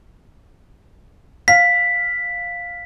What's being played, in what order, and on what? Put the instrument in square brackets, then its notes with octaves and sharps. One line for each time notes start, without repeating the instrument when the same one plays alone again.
[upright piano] F5 [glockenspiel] B6